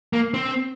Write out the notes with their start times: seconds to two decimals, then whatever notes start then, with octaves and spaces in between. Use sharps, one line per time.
0.13 A#3
0.34 C4